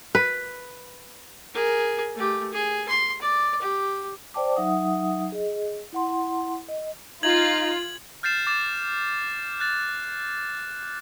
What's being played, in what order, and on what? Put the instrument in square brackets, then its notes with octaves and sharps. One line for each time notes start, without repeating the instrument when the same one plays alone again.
[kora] B4
[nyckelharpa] G#4 A#4
A3 G4
G#4
C6
D5
G4
[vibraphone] C5 D5 G5 A5 D6
F#3 D#4 E5 F#5 D#6
G#4 D#5
E4 F#5 C6
D#5
[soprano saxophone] D#4 [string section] F4 [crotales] G#6 F#7
[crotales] F6 G6 A6 C7 E7
D6 A6 E7
F#6 A6